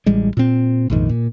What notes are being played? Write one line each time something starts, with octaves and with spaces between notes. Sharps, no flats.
A1 G3 G#3
A#2 C4
A#1 F2 G#2 D#3
A#2